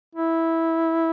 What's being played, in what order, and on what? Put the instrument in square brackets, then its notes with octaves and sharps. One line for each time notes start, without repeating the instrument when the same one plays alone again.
[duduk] E4